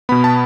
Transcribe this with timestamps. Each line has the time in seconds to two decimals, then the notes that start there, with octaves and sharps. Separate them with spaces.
0.09 B2 B3 B5
0.24 A5